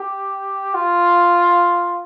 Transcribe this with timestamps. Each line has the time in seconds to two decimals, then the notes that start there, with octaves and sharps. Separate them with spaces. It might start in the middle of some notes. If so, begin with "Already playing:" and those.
Already playing: G4
0.74 F4